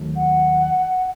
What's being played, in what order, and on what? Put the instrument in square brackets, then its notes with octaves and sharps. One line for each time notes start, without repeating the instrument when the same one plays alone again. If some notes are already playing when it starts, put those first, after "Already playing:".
Already playing: [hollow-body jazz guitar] D#2 D#3 F#3 A3
[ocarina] F#5